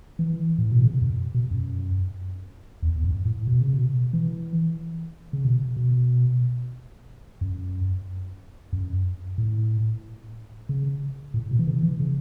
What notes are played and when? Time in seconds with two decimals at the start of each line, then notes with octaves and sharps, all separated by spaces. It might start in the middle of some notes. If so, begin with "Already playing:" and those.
0.19 E3
0.59 A2
0.71 B2
0.85 C#3
1.02 F#2
1.34 B2
1.51 F#2
2.82 E2
2.96 E2
3.04 F#2
3.25 A2
3.47 B2
3.61 C#3
3.73 B2
4.13 E3
5.33 C#3
5.45 B2
5.76 B2
7.41 F#2
8.73 F#2
9.38 A2
10.69 C#3
11.34 A2
11.51 B2
11.59 E3
11.67 C#3
11.83 E3
12.00 C#3